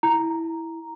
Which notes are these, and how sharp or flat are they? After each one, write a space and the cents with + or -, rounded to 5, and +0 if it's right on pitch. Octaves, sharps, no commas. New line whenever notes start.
E4 -5 A#5 +0